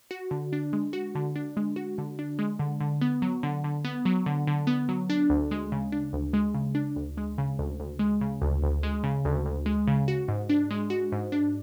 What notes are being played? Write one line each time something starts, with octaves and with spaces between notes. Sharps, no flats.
F#4
D3
D4
G#3
F#4
D3
D4
G#3
F#4
D3
D4
G#3
D3
D3
B3
F#3
D3
D3
B3
F#3
D3
D3
B3
F#3
D4
D2
G#3
C#3
D4
D2
G#3
C#3
D4
D2
G#3
C#3
D2
D2
G#3
C#3
D2
D2
G#3
C#3
D2
D2
G#3
C#3
F#4
G#2
D4
G#3
F#4
G#2
D4